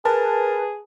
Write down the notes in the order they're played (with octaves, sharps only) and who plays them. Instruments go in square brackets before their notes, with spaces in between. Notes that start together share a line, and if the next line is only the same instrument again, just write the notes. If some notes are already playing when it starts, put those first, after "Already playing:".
[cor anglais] G#4 [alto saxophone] A#4 [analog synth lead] B4 [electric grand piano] A5